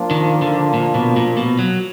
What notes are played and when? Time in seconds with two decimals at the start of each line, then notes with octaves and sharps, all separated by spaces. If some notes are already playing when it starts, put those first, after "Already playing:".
Already playing: F3 A#3 D4 F4
0.11 D#3
0.42 D3
0.74 A#2
0.95 B2
1.17 A#2
1.37 B2
1.59 F#3